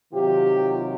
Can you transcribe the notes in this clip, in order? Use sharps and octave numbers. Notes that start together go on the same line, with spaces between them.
C3 D#3 F#3 F4 G4